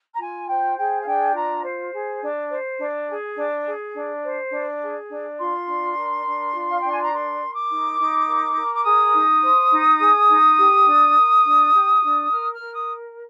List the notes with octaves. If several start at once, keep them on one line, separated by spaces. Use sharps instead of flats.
A#5
F4 G#5
C5 G5
G#4 G5
F5
D4 G5
F4 A#5
C5
G#4
D4
C5
D4
G#4
D4
G#4
D4
C5
D4
G#4
D4
F4 C6
D4
A#4
D4
F4
F5
D4 G5
G#5
A#5
A#4 C6
A#4
D6
D#4
D#4
A#4
A#4
D6
G#4 D#6
D#4
C5
D#4
G#4
D#4
G4
D4
A#4
D4
G4
D4
A#4 F6
F6
A#4
D#6